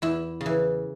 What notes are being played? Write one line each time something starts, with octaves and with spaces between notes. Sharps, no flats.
E2 E4
C#3
E3